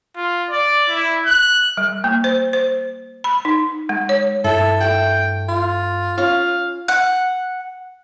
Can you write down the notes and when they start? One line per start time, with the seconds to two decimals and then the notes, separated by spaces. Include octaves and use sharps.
0.16 F4
0.50 D5
0.90 E4
1.26 F#6
1.77 G3
2.04 A#3
2.24 C5
2.53 C5
3.24 B5
3.45 D#4
3.89 G#3
4.09 C#5
4.44 G2 E4 A4 B4 G5
4.81 A3 A4 F#5 G5
5.49 F4
6.18 C#4 F4 F5 A#5
6.88 F#5